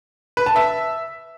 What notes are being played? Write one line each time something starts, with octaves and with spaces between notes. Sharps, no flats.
B4
A5
E5